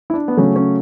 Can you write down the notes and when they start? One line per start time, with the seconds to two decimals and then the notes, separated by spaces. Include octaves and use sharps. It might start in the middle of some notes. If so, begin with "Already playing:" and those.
0.10 E4
0.14 D4
0.28 B3
0.37 C#3 F#3 A3 C#4
0.56 C#4